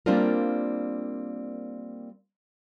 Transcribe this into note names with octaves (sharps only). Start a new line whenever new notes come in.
G3 A#3 C4 D4 F4 A#4